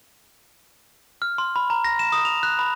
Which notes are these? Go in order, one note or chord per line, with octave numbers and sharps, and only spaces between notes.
F6
C6
B5
A#5
A#6
E7
D#6
F7
F#6
B5